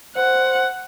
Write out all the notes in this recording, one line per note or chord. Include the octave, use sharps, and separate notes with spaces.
C5 F#5